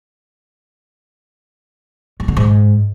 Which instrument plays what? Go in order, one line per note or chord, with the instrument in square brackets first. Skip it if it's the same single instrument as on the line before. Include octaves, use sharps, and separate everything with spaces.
[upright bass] G2
D3
G#2